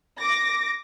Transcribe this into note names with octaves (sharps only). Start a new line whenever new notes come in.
D6 A#6